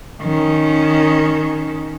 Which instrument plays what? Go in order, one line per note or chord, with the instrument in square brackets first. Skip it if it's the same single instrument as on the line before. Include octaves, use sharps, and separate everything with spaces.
[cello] D#3 C#4